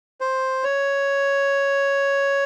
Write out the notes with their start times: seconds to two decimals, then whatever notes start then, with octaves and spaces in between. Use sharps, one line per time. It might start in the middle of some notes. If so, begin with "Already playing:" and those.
0.21 C5
0.64 C#5